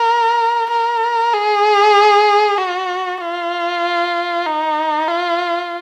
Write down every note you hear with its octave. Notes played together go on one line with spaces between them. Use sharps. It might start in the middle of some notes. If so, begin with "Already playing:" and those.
Already playing: A#4
A#4
G#4
F#4
F4
D#4
F4